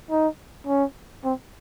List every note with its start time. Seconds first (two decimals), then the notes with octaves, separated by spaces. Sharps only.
0.11 D#4
0.67 C#4
1.24 C4